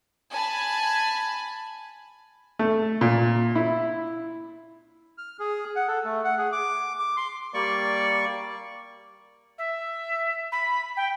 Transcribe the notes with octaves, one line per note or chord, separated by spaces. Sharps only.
G#5 A5 B5
A3
A#2
E4
F6
G#4
F#5
A4
A3
F#5
G#4
D6
D6
C6
G3 A#3 D5 C#6
E5
B5
G5